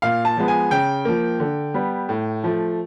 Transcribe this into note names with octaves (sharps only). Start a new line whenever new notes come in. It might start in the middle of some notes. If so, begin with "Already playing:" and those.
A#2 F5
A5
F3 G#3 B3
G#5
C#3 G5
F3 A#3
D3
G3 B3
A2
F3 A3